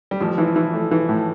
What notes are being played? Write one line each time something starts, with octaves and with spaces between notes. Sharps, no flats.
G3
A1 F3
E3
E3
A3
E3
A2